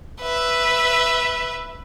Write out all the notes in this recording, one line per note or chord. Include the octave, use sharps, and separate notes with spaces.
B4 E5